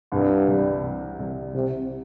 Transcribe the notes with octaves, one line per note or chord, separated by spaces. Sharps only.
C2 G2
C3 G3
C2
C3 G3
C2 C3